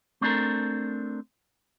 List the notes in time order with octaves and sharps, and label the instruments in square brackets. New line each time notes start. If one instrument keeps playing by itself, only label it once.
[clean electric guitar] A3 C4 D4 F#4 A4 A#4